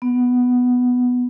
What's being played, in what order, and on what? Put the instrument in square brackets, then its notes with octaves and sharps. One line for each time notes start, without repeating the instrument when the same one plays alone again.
[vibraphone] B3